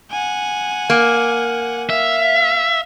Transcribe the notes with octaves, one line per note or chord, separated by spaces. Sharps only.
F#5 G#5
A#3
E5 F5